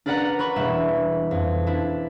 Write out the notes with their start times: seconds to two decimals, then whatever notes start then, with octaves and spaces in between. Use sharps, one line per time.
0.06 D4 A#4 B4 D5 F#5 A#5
0.39 B4 B5 C#6
0.56 E1 G3 E5
1.31 F2
1.67 D4 E4